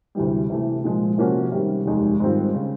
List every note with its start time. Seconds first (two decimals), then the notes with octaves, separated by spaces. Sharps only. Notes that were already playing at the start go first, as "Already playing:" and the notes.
0.15 D2 C3 E3 G3
0.50 C3 E3 A3
0.84 A#2 F3 G#3
1.18 C3 F3 A#3 C#4 F#4
1.52 C3 D#3 G3
1.86 F1 D#2 D#3 G#3
2.20 G#2 D#3 G3 C4 F4
2.54 C#3